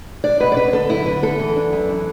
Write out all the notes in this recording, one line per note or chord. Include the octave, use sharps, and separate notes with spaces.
D4 D5
B2 B4
D5
D4 B4
D3 A4
F#2 E4
D3 B4
B3 A4
E3
D4
F#2
E3